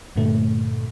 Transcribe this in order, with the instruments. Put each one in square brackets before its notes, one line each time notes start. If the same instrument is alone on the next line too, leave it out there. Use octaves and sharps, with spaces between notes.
[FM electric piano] G2 A#2 D3 A3